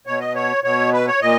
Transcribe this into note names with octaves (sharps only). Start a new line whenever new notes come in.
B2 C#5
D#5
C#5
B2 C#5
B4
C#5
A#2 D#5